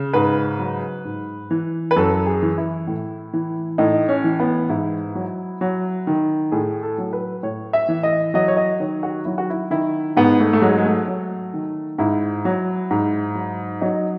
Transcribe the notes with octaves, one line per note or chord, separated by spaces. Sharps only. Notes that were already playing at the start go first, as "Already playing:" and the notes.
Already playing: C#3
G#2 B4
F#3
G#2
E3
B4
F#2 A4
G#4
E3
E4
A2
E3
A2 D#4
C#4
E3
B3
G#2 E4
F#3
F#3
D#3
A2 G#4
A4
F#3
B4
A2 C#5
E5
E3
D#5
F#3 D#5
C#5
D#5
D#3 C#5
F#4
F#3 E4
F#4
E4
D#3 E4
G#2 B3
A3
A3
F#3 G#3
G#3
A3
F#3
D#3
G#2 E4
F#3
G#2
F#3
F#3 D#4